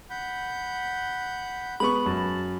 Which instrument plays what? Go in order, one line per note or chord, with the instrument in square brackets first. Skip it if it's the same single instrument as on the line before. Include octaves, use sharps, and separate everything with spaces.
[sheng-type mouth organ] F#5 B5 G6
[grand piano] G#3 B3 C#6 [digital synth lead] B5
[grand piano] F#2 [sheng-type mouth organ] A5